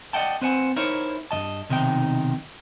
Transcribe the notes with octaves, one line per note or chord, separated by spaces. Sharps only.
D5 D#5 F#5 G5 A5
C4 B4 C5 F#5 G#5
D#4 E4 A#4 C5 C#5
G2 B2 D#5 A5
B1 C3 D#3 D#4 G5